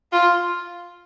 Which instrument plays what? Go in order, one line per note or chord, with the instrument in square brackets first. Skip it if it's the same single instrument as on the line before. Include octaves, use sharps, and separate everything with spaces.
[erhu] F4